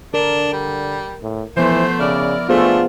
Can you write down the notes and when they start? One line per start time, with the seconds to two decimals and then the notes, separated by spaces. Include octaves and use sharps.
0.14 D3 D4 A#4
0.53 G3
1.22 A2
1.57 E3 F3 A3 B3 C5
2.00 C#3 E4 A#4 D5
2.49 A3 B3 D4 F4 G#4 C5